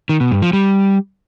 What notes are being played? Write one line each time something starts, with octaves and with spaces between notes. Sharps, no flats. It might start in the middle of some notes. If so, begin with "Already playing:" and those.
D#3
B2
G2
F3
G3